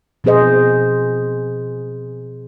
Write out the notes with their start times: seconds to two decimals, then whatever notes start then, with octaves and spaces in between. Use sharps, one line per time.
0.24 B2 F3 C4 G#4 C5 D#5